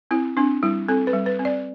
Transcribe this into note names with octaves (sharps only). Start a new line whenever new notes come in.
C4 E4
C4 D4
G3 E4
C4 A4
B4
G3
B4
C4
D5